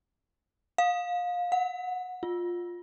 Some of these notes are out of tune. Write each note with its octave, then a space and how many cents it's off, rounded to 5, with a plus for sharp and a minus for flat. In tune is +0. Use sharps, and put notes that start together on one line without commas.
F5 +25
F#5 -20
F4 +10